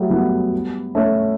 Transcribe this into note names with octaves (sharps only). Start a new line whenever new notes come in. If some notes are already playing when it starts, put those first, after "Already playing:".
Already playing: F#3 G3 A3
G3 B3
A3 C#4